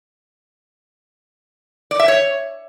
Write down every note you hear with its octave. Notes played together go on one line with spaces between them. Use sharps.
D5
E5
C#5